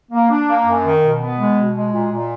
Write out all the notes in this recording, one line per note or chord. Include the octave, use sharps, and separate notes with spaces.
A#3
D4
A#3
F#2
D#3
B2
B3
G#3
B2
G#3
A#2
A#2